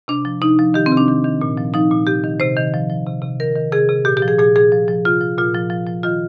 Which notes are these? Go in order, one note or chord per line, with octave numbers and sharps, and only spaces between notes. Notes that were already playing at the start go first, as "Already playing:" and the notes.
C3 D4
F3
C3 D#4
F3
D#3 G4
C4
C3
D4
D#3
D#3
A#2
F3
F3 D#4
A#2
C3 G4
D#3
C3 C5
D#3
F3
F3
C3
C3
D#3 A#4
D#3
C3 G#4
C3
A#2 G4
G4
F3
G#4
A#2 G#4
A#2 G#4
F3
F3
C3 F4
F3
A#2 F4
F3
F3
F3
D#3 F4